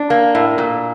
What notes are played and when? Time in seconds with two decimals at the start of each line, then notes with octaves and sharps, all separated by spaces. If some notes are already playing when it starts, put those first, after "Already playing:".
Already playing: D4
0.10 A#3
0.35 A2
0.58 A#2